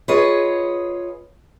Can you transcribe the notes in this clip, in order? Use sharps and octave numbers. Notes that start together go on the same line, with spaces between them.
F4 G#4 B4 C#5 D#5